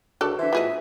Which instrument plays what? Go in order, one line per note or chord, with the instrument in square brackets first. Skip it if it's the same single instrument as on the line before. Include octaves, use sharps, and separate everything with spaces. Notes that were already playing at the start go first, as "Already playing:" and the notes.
[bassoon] C#2 [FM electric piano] D3 [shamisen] F#4 A4 D5
[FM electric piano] D3 C5 [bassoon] E3 [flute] E5
[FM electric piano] A2 F3 F#4 [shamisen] B3 G#4 D#5